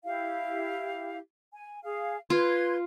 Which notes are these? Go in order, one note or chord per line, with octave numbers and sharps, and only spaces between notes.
E4 G4 F5
G#5
G#4 F5
F4 B4 C6 G#6